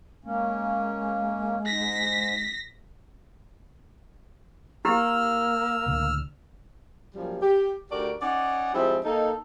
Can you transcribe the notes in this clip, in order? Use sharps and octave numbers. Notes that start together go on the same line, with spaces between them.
G#3 A#3 C#4
G#2 A#6 B6
A#3 E4 G4 E6 F6
C#2 A2 D3
F#2 A#2 F3 G3
G4
D2 D#3 F#4 G4 A#4 D5
C#4 D#4 D5 F#5
F3 G3 G#3 C4 E4 G#4
A#3 D#4 A4